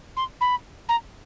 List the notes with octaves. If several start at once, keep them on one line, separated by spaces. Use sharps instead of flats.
C6
B5
A#5